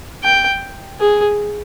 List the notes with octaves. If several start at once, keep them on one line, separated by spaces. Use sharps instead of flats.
G5
G#4